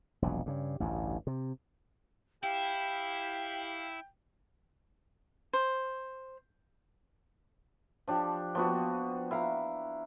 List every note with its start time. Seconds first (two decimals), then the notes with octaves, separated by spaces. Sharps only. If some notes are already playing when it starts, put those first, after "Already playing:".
0.22 E1 A#1 A#2 F#3
0.46 G2 C#3
0.80 A1 D2 G2
1.27 C3
2.43 E4 G4 F5 G5
5.53 C5
8.08 F3 D4 G4
8.55 F3 B3 F#4
9.31 E4 F5 A#5